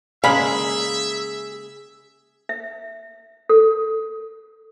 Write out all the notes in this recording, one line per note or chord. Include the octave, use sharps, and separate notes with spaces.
C#3 G#3 A#3 G#4 E5 F5 B5 B6
E5
A4